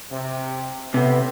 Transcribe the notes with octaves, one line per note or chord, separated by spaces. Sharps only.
C3
A2 C3 B3